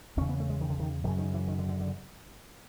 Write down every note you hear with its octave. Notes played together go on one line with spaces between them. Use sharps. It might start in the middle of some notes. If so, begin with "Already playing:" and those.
E2 C#3 C#4
B3
A3
G#3
D#3
D3
D#3
F#2 C#3 D3
D#3
E3
D#3
D3
D3
D3